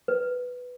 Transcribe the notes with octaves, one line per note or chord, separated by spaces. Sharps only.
B4